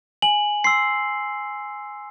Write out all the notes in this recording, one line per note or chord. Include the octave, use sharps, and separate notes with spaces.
G#5 F#7
C6 E6 C7